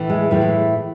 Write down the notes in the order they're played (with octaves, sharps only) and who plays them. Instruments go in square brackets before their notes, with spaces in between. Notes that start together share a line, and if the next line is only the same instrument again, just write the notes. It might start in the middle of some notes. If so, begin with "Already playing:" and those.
Already playing: [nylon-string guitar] A2 E3
G#3
A2 E3 G3
G#3